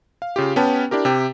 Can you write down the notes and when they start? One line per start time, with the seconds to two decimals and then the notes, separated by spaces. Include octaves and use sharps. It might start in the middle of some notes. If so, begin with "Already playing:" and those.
0.22 F5
0.36 C#3 F4 G4
0.56 B3 C#4 G4 B4 G5 A5
0.91 D4 E4 G4 A#4
1.05 C3 G4 G5